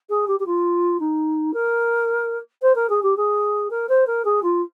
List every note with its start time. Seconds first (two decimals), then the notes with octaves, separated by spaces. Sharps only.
0.10 G#4
0.28 G4
0.40 G4
0.46 F4
1.00 D#4
1.54 A#4
2.62 C5
2.75 A#4
2.90 G#4
3.03 G4
3.17 G#4
3.70 A#4
3.89 C5
4.07 A#4
4.25 G#4
4.43 F4